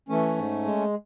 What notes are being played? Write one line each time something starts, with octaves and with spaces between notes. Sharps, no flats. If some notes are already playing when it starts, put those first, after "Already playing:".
E3 A3 C#4
G#2
G#3